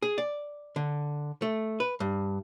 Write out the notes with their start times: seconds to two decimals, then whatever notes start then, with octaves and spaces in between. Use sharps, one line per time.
0.02 G#4
0.18 D5
0.76 D3
1.42 A3
1.80 B4
2.00 G2